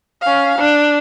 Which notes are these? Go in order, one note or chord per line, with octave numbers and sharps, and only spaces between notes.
C#4 F5
D4